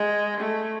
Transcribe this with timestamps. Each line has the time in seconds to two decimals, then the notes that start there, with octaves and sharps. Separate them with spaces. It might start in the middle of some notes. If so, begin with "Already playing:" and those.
Already playing: G#3
0.40 A3